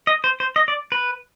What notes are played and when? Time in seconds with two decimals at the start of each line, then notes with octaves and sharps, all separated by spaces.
0.07 D#5
0.24 C5
0.40 C5
0.56 D#5
0.68 D5
0.92 B4